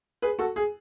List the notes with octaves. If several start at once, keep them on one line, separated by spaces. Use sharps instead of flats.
G#4 B4
F#4 A4
G#4